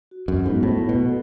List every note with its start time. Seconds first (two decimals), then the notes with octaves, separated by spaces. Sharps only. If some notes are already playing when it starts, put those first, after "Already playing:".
0.11 F#4
0.28 F#2 A4
0.46 G#2 B3
0.63 A2 B3
0.81 F#4
0.89 B2
0.98 A4